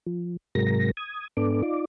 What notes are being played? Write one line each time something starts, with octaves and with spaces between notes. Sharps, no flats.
F3
G#2 C3 F#3 G#3 A#4 A#6
D#6 G#6
G#2 B3 D4 A4 D6
D#4 F4 D5 D6